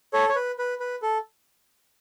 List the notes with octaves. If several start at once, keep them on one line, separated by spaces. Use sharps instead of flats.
A4 C#5
C#5
B4
B4
B4
A4